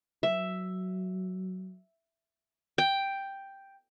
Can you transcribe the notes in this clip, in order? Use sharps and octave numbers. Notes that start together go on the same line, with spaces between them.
F#3 E5
G5